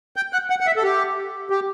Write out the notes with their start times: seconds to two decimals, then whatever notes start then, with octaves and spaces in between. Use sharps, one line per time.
0.16 G5
0.33 F#5
0.50 F#5
0.60 F#5
0.67 E5
0.76 A4
0.83 G4
1.50 G4